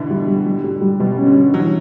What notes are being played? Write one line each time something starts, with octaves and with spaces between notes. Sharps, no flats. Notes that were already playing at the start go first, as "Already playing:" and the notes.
Already playing: B2 D3 E3
G3
G3
G3
G3
G3
B2 G3
C#4
D3
G3
E3 F#3